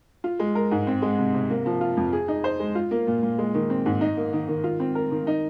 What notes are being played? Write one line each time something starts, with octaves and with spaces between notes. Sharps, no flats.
F4
G#3
A#4
G#2
C4
G#3
C3
C3
A#3
F3
F4
F2
G#4
D#4
C5
G#3
F4
A#3
A#2
A#2
G#3
D#3
C4
G#2
D#4
A#3
D#3
D#3
F4
C4
A#4
D#3
D#4